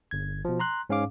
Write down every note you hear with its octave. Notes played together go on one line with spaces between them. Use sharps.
G1 G#6
B2 F3
A#5 C6 F#6
G#2 C#4 G#4 F5 D6